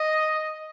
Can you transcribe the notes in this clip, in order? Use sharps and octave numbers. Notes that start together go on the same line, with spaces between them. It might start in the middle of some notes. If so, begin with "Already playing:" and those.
Already playing: D#5